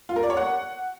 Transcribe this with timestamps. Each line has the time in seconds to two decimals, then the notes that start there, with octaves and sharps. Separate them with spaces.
0.09 F4
0.16 A#4
0.23 D5
0.30 C#5
0.37 F#5